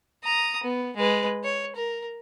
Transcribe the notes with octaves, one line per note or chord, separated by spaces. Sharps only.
A#5 D#6
B3
G#3 B4
C#5
A#4